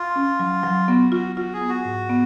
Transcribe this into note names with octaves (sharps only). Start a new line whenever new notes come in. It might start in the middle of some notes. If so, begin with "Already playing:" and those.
Already playing: F4
C#4
F#3
F#3
B3 F#4
F4 F#4
F4 F#4
G#4
B3
F#4
G#2
B3